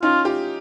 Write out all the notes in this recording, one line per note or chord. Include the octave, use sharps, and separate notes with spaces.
C#4 D#4 F4
F4 G4